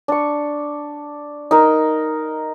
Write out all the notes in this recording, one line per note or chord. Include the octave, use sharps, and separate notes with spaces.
D4 C#6
D#4 A#4